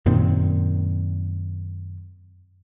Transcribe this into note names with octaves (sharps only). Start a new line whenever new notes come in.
F#2 A#2 D#3 C4